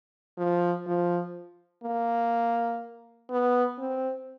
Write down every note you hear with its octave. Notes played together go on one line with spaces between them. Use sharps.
F3
F3
A#3
B3
C4